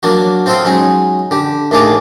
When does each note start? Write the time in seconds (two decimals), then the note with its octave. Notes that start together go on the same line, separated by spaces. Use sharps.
0.03 F#3 A#3 D4 F#4
0.46 C4 F4 A4 C5 D#5 G5
0.65 F#3 G#3 C#4 D#4
1.31 D3 G4
1.71 D#2 A2 D4 G#4 D5 D6